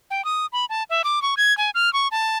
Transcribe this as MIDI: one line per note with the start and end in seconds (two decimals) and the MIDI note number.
0.11 0.24 79
0.25 0.46 87
0.53 0.65 83
0.70 0.83 81
0.90 1.02 76
1.04 1.22 86
1.22 1.35 85
1.37 1.56 92
1.58 1.70 80
1.75 1.92 89
1.93 2.08 85
2.11 2.38 81